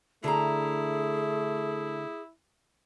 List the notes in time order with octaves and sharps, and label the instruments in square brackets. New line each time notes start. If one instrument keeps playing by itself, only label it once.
[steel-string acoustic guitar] D3 A#5 [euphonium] A3 [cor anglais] E4 [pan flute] G#4